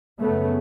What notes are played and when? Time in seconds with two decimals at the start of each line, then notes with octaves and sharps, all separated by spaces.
0.20 F#2 C#3 A3 B3